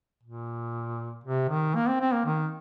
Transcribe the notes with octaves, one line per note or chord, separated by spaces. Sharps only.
A#2
C3
D#3
A#3
C4
C4
A#3
D#3